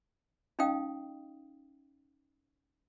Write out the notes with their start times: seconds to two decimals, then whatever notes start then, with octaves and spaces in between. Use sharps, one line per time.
0.59 C#4 D#4 D#5 F5 G5 D#6